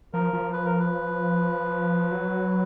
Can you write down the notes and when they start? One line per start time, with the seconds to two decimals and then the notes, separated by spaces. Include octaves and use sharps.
0.13 F3 A#4
0.33 F3
0.53 B4
0.65 A#4
0.80 B4
2.12 F#3